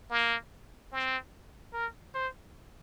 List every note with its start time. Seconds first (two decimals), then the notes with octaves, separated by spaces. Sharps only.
0.10 A#3
0.92 C4
1.74 A#4
2.15 C5